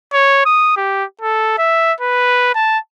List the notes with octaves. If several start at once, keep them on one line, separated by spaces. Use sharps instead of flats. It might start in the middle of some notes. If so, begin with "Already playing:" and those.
C#5
D#6
G4
A4
E5
B4
A5